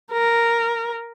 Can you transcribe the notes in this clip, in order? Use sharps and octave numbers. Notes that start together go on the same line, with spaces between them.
A#4